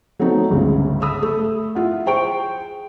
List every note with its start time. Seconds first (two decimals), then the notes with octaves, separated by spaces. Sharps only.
0.19 F#3 A3 B3 C4 D#4
0.50 G1 C#2 G#2 C#3
1.02 B5 D#6 E6
1.23 A3
1.75 E4 F4 F#5
2.06 G#4 C5 G5 C#6 D7